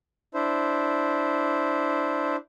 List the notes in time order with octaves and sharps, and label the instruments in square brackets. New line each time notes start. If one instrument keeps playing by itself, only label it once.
[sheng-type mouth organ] D4 E4 C5